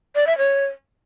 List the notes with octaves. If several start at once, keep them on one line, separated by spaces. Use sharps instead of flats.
D5
E5
C#5